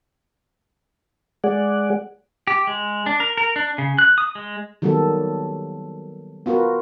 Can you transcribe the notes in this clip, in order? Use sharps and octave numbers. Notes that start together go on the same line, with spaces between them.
G#3 G#4 D5 F#5
G4
G#3
D4
A#4
A#4
D4
C#3
F#6
D#6
G#3
D#3 F#3 G3 A#3 B3 A4
B3 F4 F#4 A#4 B4